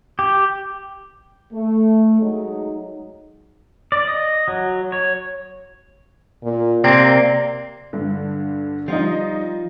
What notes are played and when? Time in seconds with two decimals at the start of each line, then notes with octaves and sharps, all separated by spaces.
0.19 G4
1.52 A3
2.21 F#3 G#3 D#4
3.92 D5
4.07 D#5
4.48 F#3
4.92 C#5
6.44 A#2
6.84 C3 A#3 C4 D5
7.93 G2 D3
8.88 F3 G3 D#4 F4